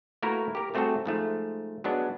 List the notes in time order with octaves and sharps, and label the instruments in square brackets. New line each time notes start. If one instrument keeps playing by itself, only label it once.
[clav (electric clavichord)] A3 A#3 E4 F#4 A#4 B4
G4 A#4
G3 A3 C4 F#4 G#4 A4
G#2 F3 A3
F#3 G#3 B3 D4